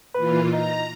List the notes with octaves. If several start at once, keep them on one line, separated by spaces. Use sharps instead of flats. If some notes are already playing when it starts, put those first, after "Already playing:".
A#2 E3 F4 B4
D#4 A#5